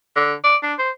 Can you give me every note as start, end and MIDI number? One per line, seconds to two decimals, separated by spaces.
0.16 0.34 50
0.44 0.56 74
0.63 0.73 62
0.79 0.90 72